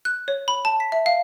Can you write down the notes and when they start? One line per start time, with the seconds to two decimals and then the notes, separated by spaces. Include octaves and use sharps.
0.05 F#6
0.28 C#5
0.48 B5
0.65 A5
0.80 B6
0.92 E5
1.06 F5